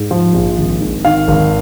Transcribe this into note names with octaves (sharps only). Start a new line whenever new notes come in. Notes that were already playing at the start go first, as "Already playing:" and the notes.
Already playing: G#2
F3
A#1
G#1
G#2
D#3 F5
G#1